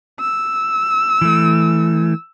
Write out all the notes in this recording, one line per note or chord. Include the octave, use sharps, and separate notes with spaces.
E6
E3 A3